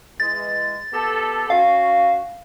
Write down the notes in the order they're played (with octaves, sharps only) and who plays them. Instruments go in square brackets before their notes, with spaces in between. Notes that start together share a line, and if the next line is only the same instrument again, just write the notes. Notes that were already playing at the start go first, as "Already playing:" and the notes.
[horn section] E3 G#3 [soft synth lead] A6
[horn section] B3 G4 A4
[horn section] C#4 F#4 [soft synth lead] F5